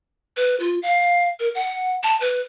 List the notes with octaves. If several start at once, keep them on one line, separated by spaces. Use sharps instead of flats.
B4
F4
F5
A#4
F#5
A5
B4